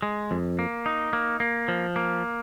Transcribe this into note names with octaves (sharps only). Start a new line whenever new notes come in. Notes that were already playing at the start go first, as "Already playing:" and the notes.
G#3
F2
A#3
D#4
A#3
A#3
F3
A#3